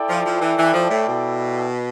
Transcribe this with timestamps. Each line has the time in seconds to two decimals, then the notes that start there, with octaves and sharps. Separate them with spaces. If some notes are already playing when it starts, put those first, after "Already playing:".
Already playing: E4 A4 D5 G5
0.10 F3
0.26 F3
0.41 E3
0.58 E3
0.74 F3
0.90 A2
1.07 B2